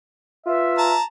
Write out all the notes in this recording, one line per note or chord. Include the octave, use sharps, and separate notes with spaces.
F4 B4 E5
A5 A#5